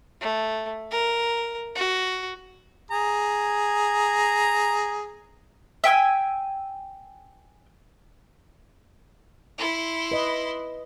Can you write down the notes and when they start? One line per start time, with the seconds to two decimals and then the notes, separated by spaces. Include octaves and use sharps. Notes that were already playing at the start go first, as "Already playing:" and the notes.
0.21 A3
0.91 A#4
1.75 F#4
2.91 G#4 A#5
5.84 E5 G5 G#5 E6
9.58 E4 C6
10.12 B4 D#5